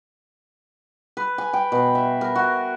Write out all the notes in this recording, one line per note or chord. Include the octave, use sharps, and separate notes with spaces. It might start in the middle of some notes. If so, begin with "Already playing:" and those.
B4
G#5
G5
B2
E5
A#4
F#4